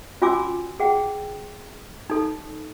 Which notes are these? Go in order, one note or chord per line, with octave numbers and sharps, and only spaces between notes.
C#4 F4 F#4 G#5 D6 E6
G#4 F#5 G5
D#4 A4